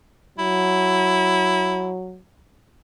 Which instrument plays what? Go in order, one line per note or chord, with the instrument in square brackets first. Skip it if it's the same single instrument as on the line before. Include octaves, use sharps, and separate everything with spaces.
[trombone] F#3 [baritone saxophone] E4